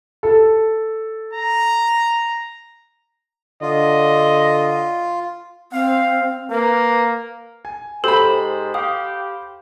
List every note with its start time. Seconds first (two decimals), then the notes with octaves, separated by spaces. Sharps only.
0.23 A4
1.33 A#5
3.62 D3 F4 D#5
5.72 C4 F5
6.50 A#3 B4
7.65 G#5
8.04 G#2 G4 A4 C5 B5
8.74 G4 F5 D#6